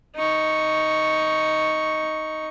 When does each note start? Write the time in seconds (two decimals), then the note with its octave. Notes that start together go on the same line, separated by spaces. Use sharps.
0.16 D#4 C#6